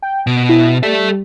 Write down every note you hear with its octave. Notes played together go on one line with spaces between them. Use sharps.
G5
B2 D7
E4
G3 A4 E5